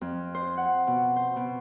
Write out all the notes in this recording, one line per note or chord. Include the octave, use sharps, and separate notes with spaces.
F2
C5
F#5
B2
C5
B2